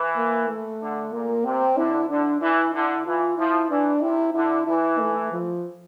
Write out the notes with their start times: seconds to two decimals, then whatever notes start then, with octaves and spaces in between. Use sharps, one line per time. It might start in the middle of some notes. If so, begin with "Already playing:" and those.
Already playing: E3
0.16 A#3
0.48 A3
0.81 D3
1.12 A#2 A#3
1.45 C3 C4
1.77 D3 E4
2.09 D3 D4
2.42 E3 E4
2.74 D3 E4
3.06 E3 F4
3.38 F3 E4
3.70 E3 D4
4.02 C3 E4
4.34 D3 E4
4.67 E3 E4
5.00 A3
5.32 F3